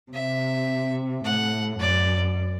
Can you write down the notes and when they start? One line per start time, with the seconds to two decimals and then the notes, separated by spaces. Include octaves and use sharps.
0.13 C3 E5
1.24 A2 F#5
1.79 F#2 D5